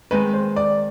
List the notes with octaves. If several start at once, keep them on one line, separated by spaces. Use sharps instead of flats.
D#3 G#3 C4 B4
C5
D5